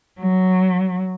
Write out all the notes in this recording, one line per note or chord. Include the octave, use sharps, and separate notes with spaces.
F#3